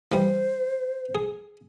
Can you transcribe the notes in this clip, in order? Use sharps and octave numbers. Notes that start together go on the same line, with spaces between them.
E3 G3 C5
G#4